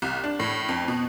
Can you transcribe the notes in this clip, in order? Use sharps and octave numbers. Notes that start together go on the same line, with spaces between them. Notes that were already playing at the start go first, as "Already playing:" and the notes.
C2
D4
A2
F2
B2